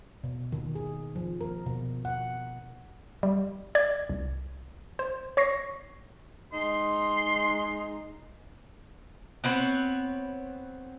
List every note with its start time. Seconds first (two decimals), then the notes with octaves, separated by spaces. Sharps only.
0.24 B2
0.52 D#3
0.75 G#4
1.16 F3
1.41 A#4
1.66 B2
2.05 F#5
3.23 G3
3.75 D5 G#6
4.10 C2
4.99 C5
5.37 C#5 C#6 A#6 C7
6.53 G#3 D#4 C6
9.44 B3 C4 B4 C#5